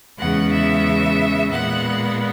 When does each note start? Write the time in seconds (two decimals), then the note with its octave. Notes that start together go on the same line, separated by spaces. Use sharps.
0.19 E2 C#3 G#3 B3 F#5
0.52 E5
1.52 A#2 G#3 B3 F#5